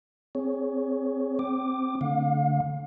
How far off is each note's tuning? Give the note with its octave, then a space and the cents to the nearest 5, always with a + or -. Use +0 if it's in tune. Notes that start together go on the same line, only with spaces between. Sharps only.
C4 +0 G#4 +0 C#5 +15
C4 +0 G5 -20 D6 +20
D3 -20 A3 +20 F5 +40